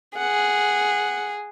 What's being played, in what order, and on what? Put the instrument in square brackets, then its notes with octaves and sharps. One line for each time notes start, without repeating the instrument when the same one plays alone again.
[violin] G#4 [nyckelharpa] F#5